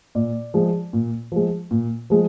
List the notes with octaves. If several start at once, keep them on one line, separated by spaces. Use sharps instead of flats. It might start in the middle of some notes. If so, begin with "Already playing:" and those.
A#2 D5
F3 G#3
A#2
F3 G#3
A#2
F3 G#3